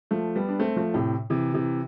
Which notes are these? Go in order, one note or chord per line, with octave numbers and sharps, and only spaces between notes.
F3 A3
G3 B3
D4
A3 C4
F3 A3
A2 C3
C3 E3
C3 E3